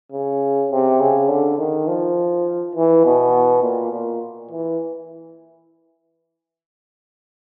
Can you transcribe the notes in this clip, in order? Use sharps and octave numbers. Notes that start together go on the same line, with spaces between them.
C#3
C3
C#3
D3
D#3
F3
E3
B2
A#2
A#2
E3